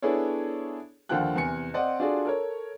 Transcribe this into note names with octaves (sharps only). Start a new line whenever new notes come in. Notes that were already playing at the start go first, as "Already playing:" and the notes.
B3 D4 E4 G#4 A4 C#5
D#2 D3 F3 F#5 G5 F#6
E2 C3 G#5 C#7
C4 D5 D#5 F#5
D4 F4 F#4 G#4 A4 D5
A4 A#4 C#5